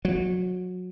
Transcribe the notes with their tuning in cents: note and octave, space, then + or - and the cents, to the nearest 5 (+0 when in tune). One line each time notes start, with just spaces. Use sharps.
F#3 -25